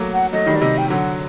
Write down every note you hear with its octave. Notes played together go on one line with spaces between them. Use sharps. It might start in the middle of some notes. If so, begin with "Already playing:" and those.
Already playing: F#3 A3 A#3
F#5
F#3 A3 D#5
D#3 G3
D5
C3 D#5
G5
D3 F#3 F#5